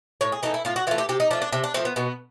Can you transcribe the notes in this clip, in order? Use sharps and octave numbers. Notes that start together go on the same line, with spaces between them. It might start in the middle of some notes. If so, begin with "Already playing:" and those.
A2 C#5
G#4
E3 A3 D#4
E4
A2 F4
F#4
E3 A3 F4
G4
C3 G4
D#4
F3 A3 D4
D4
C3 D4
D4
F3 A3 C4
B3
B2 B3